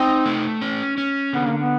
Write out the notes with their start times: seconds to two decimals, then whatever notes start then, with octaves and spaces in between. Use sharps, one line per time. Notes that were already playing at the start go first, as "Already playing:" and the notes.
Already playing: C4 D#4
0.26 A3
0.61 C#4
0.98 C#4
1.33 D3 B3
1.46 A#3
1.58 B3